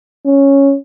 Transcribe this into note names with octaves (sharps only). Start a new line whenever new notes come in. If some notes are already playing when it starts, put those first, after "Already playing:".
C#4